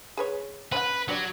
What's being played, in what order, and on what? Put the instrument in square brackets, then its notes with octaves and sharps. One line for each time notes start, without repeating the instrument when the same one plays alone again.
[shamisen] G#4 B4 C#5
[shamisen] C4 C#4 F#5 [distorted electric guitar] B4
[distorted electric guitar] F#3 [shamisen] D4 G4 D5